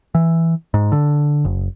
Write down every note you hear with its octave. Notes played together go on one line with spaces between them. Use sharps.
E3
G#2
D3
F#1